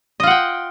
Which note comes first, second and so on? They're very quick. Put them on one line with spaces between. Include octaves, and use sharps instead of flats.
D#5 F4 F#5 G5